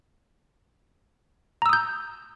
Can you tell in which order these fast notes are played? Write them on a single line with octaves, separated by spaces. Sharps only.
A#5 E6 D#6 G6